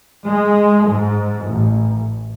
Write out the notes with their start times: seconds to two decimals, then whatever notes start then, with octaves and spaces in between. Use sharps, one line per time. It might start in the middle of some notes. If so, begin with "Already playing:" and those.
0.25 G#3
0.87 G#2
1.44 A1